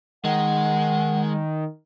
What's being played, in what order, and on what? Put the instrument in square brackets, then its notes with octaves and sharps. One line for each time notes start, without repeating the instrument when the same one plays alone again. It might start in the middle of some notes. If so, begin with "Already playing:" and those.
[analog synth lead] D#3 [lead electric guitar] G#3 [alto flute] F#5